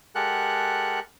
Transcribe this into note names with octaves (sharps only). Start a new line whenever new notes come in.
G#3 G4 A4 A#4 F#5 F#6